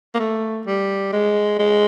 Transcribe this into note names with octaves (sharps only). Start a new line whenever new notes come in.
A#3
A3
G3
G#3
G#3